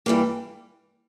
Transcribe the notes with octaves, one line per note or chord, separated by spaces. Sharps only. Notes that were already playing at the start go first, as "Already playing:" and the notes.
G2 E3 G3 A#3